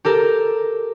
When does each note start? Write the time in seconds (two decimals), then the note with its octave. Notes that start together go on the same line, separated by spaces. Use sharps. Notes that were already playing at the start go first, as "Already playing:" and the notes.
0.05 G4 A4 A#4